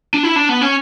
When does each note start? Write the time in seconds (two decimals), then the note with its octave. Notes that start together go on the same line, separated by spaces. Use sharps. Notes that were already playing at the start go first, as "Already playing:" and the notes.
0.14 D4
0.23 E4
0.36 D4
0.49 B3
0.61 C#4